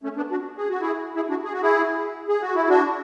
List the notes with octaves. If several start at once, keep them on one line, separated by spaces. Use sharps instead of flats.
A3 C#4
B3 D4
D4 F#4
G#4
F#4
E4 G#4
E4 G#4
D4 F#4
G#4
F#4
E4 G#4
G#4
F#4
E4
D4 F#4